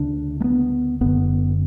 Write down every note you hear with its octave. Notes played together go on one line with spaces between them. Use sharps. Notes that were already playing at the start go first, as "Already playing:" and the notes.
Already playing: D2 C#3 D4
A3
B3
F#1 F#2 D3 B3